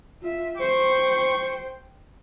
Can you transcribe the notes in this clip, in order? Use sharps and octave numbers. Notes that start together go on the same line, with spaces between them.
F4 E5
C5 G5 C#6